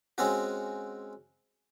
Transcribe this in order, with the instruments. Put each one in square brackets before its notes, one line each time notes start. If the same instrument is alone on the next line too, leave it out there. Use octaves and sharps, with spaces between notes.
[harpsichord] G#3 C4 C#4 F#4